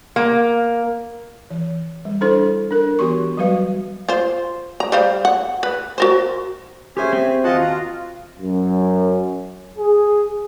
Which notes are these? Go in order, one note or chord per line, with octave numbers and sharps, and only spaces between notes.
A#3
E3
G3
D4 E4 A4 C5 C6
D4 A#4
E3 B3 F#4 G4 C6 C#6
F#3 G3 F#4 B4 F5
F4 C5
A#5
G3 C5 F5
F#5
B4
F#4 A#4 C5
C#4 G4 G#4 C5 E5 G#5
C4 G#5
D#2 F4 F#4 D#5 F#5 A5
A#5
F#2
G#4